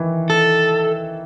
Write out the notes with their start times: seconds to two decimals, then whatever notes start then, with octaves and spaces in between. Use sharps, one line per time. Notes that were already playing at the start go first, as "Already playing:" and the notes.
Already playing: D#3 E3
0.30 A4